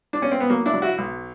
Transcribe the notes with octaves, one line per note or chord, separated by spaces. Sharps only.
D4
C#4
C4
B3
F#3 A#3
D4 E4
F#3
E4 F#4
B1